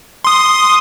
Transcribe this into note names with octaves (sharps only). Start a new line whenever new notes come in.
C6 D#6